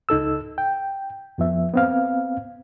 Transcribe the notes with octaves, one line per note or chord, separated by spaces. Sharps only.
C#2 D#4 A4 E6
G5
F2 F3 B3 E5
B3 C4 F5